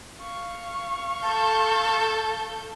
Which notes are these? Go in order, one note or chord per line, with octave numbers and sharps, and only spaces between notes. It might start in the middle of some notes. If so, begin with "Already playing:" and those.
F5 C#6
A4 A5 G6